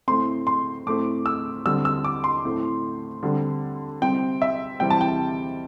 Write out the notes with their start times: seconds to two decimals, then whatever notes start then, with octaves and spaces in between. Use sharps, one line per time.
0.08 A2 A3 C4 C6
0.47 C6
0.86 A2 A3 C4 D6
1.26 E6
1.66 D3 G3 C4 E6
1.85 E6
2.04 D6
2.24 C6
2.45 A2 A3 C4
3.23 D3 G3 C4
4.02 C3 G3 C4 G5
4.42 E5
4.80 C3 E3 G3 C4 G5
4.90 A5
5.01 G5